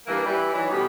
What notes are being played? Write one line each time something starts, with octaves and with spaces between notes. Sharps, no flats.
G2 E3 A#3
E3 G3
E3 F#3 D#4
B2 G3 A3 B3 C#4 G4